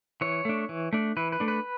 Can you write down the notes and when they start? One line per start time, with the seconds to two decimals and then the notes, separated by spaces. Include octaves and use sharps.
0.21 E3 C#5
0.45 A3 D4
0.69 E3
0.93 A3 D4
1.17 E3 B4
1.32 B4
1.40 A3 D4
1.48 B4